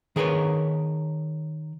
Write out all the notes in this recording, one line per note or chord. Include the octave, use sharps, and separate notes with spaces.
D#3 G#4 A#4 B4 C#5